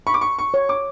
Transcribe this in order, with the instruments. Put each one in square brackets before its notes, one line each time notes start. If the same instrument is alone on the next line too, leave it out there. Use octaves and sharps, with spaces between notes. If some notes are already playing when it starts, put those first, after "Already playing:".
[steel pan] B5 [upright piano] C#6
[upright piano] D6
C#6
C#6
[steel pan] C#5
[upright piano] D6